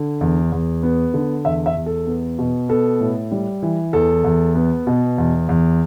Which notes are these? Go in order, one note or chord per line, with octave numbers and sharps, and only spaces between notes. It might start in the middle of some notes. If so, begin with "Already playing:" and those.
Already playing: D3
E2
E2
B3
D3
E2 E5
E5
E2
A4
B3
B2
B3 A4
A2
G3
E3
E2 A4
E2
B3
B2
E2
E2